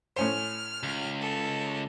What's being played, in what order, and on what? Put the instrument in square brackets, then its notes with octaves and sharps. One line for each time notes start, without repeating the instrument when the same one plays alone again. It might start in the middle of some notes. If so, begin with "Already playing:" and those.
[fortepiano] A2 C#4 C5 [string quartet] F6
[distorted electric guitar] C#2
[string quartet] A4